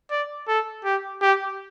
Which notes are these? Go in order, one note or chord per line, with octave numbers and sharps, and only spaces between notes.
D5
A4
G4
G4